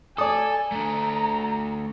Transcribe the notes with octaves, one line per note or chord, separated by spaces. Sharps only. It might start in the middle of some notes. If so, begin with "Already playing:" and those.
A4 D5 G#5 D#6
A3 D4 A#5